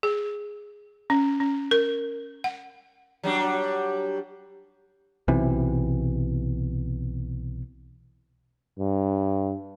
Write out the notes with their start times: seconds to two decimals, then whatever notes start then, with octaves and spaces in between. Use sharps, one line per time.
0.03 G#4
1.10 C#4
1.40 C#4
1.71 A#4
2.44 F#5
3.23 F#3 G3 D4
5.28 B1 C3 E3
8.79 G2